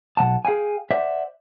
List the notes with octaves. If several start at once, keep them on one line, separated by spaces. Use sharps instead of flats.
B1 D#3 F#5 A5
G#4 F5 G5 G#5
C5 D5 E5 F#5